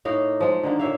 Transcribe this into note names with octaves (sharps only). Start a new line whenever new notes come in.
A2 A#3 D#4 F5
F3 G#3
D3 D#3 A#3
A#2 C#5 E5 F5